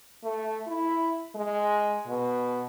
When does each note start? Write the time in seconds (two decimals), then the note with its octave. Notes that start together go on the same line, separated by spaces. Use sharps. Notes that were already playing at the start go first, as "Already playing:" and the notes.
0.23 A3
0.67 E4
1.35 G#3
2.07 B2